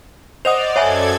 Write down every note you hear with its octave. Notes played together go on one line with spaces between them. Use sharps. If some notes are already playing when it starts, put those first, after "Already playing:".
C5 D5 D#5 F#5 D#6 F7
F#2 A4 C#5 E5 G#5 G#6